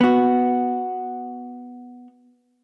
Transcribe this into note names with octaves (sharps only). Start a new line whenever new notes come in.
B3 F#4